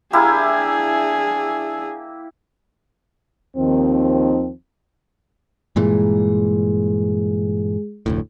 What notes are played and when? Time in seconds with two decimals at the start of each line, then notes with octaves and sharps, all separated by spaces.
0.13 A#3 D4 E4 G4 G#4
3.56 D#2 D#3 F3 C4
5.76 G2 A#2 E3 G#3 G#4
8.06 F1 D2 A2